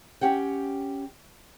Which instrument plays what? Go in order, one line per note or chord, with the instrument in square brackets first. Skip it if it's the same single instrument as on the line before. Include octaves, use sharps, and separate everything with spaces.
[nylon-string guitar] C#4 G4 F#5 G5